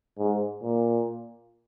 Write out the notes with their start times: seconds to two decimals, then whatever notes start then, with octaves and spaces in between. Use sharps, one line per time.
0.18 G#2
0.62 A#2